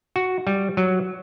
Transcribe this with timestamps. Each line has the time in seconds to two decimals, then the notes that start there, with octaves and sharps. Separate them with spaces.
0.16 F#4
0.47 G3
0.77 F#3